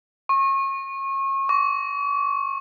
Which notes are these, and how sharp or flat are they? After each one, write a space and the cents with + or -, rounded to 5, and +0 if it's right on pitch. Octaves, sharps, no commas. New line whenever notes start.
C#6 -35
C#6 +45